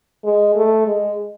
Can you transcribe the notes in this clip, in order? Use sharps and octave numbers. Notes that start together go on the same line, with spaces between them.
G#3
A3
G#3